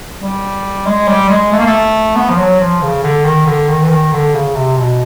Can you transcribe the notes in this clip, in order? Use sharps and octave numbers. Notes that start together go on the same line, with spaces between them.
G3
G#3
G3
G#3
A3
A#3
A3
B3
F3
F#3
F3
C#3
D3
D#3
D3
D#3
E3
D#3
D3
C#3
C3
B2